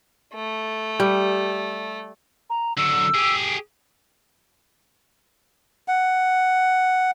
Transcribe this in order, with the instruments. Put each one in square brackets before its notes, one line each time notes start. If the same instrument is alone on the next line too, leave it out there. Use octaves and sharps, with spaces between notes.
[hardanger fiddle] A3
[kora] G3
[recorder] A#5
[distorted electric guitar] D3 F#3 [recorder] E6
[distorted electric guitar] G4 G#4
[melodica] F#5